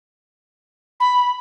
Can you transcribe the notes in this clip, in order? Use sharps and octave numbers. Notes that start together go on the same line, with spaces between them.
B5